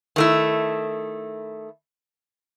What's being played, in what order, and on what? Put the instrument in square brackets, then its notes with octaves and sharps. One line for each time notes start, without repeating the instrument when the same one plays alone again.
[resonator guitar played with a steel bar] D#3 A3 E4